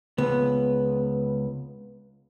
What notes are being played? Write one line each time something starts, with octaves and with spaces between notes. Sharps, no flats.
C#2 B3